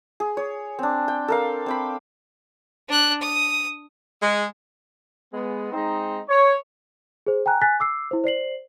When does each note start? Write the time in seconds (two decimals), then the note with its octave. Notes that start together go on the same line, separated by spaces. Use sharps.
0.20 G#4
0.37 C#5
0.79 C4 D4
1.08 G5
1.28 A4 A#4 F5
1.66 C4 G5 B5
2.89 D4 F#6
3.22 D#6
4.21 G#3
5.34 G#3 B3
5.73 G#3 C4 D#4
6.29 C#5
7.27 G#4 C5
7.46 G5 G#5 A#5 F#6
7.61 G#5 F#6 A6 B6
7.80 D6 E6 C7
8.11 E4 C5
8.24 C5 D5 C7 F#7